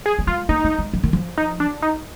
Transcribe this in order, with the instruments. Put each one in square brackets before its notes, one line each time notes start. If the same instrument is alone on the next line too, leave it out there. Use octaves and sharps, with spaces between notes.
[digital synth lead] G#4
[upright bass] A#3
[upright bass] G#3 [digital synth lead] F4
[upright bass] A#3 [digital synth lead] D#4
[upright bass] A#3
G#3
F3
D#3
F3
[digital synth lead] D#4
D4
D#4